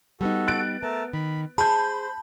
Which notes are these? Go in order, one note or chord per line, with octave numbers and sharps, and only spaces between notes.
G3 B3 D#4 F#4 A4
F#6 A6 D7
A3 B3 A#4 A5
D#3 B5
G#4 C5 A5 B5 G6